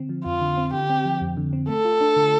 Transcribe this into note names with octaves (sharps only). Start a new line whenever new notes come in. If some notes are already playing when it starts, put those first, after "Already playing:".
Already playing: D3 C4
F3
F2 F4
D3
C4
D3 G4
C4
F3
F2
D3
C4
A3 A4
F4
D4
D3